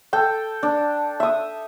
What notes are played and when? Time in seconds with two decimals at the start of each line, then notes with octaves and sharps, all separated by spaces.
0.13 A4 G5
0.63 D4
1.20 E5 D#6